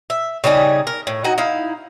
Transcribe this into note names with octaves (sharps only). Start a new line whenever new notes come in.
E5
C#3 G3 D#4 G#4
A#4
A2
D#4 F#4 F#5 G#5
D#4 E4 F5